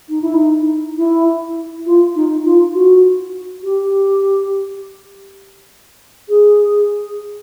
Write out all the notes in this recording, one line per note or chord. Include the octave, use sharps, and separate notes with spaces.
D#4
E4
D#4
E4
F4
D#4
F4
F#4
G4
G#4